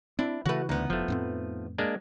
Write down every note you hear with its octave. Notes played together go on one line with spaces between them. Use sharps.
C4 D4 E4
C#3 E3 A3 F#4 B4 F#5
D2 B3 D#4
F1 F3 A3
F2 A2 C4
G#3 A#3 D4